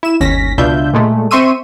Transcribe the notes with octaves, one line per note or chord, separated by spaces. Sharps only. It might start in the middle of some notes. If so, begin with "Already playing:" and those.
E4 E7
G1 D#2 C#4 A#6 B6
C#2 B2 D4 F4 E5 G6
A#2 G#3 A3
C4 E5 C6 C#6 E6 D#7